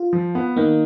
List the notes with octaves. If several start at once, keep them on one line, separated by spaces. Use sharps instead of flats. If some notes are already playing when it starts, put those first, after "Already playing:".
Already playing: F4
F3
B3
D#3 A#3